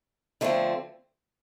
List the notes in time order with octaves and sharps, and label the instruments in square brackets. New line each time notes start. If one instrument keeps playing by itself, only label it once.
[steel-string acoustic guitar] D3 F3 A3 C4